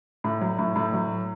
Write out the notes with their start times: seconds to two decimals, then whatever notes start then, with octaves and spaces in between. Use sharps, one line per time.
0.24 A2
0.41 F#3
0.59 A2
0.76 A2
0.94 F#3